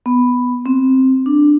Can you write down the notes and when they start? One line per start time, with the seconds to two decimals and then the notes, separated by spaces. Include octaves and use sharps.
0.06 B3
0.66 C4
1.26 D4